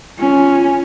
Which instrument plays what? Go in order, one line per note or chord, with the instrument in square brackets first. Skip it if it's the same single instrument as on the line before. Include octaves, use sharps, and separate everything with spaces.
[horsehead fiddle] C#4 [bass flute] F4